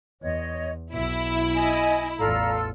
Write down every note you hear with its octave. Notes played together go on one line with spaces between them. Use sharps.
E2 C#5 D#5
B1 E4 E5
D#5 G#5
A1 E2 F4 A4 D5 F5 A#5 E6